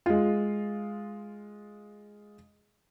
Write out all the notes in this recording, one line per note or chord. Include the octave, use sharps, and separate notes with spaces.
G#3 F4